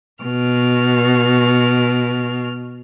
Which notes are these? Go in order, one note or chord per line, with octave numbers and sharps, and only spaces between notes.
B2 F6